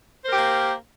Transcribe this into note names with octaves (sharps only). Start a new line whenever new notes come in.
A#3 G4 A#4 C5